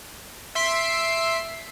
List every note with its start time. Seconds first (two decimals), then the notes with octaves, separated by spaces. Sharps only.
0.55 E5 C6 B6 C7 D7